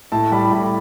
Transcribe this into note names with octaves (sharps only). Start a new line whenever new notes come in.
A2 A5
G3 B5
A2 B5